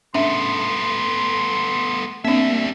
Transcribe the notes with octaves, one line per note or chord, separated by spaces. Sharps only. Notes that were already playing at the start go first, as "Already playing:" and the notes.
A3 B3 C#4 D4 E5 C6
G3 A#3 C4 D4 E5